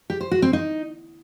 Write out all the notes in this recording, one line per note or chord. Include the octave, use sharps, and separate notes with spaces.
G4
C5
F#4
C4
D#4